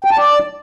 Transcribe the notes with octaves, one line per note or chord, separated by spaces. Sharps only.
G5
A5
D5